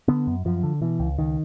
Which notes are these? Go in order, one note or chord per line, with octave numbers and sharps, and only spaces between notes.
D3 B3
F#2
F#2 F3
D3
B2 E3
C#2
C#2 D#3